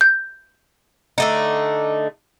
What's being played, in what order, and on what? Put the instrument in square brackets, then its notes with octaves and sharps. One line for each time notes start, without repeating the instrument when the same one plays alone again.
[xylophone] G6
[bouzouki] D3 A3 D#4